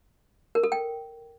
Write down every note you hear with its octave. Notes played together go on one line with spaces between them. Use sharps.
A#4
A4
G5